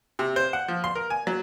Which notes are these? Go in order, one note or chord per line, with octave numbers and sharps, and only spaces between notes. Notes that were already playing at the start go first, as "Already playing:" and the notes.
C3
C5
F#5
F3
C6
A#4
G#5
F#3